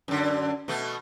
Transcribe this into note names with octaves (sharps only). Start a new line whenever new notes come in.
F#2 D3
B2 A3